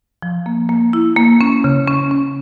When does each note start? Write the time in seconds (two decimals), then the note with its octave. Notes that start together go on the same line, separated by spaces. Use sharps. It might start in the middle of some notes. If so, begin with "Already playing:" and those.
0.22 F3
0.46 A#3
0.69 A#3
0.93 E4
1.16 A#3
1.41 C#4
1.64 C#3
1.87 C#4
2.11 C#4